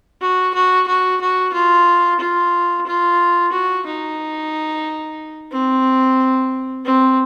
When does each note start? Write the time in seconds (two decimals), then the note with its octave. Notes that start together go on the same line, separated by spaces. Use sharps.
0.21 F#4
0.54 F#4
0.87 F#4
1.21 F#4
1.53 F4
2.20 F4
2.86 F4
3.52 F#4
3.86 D#4
5.51 C4
6.85 C4